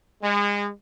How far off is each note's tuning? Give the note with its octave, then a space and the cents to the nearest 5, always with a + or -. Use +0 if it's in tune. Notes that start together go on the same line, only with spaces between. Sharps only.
G#3 -30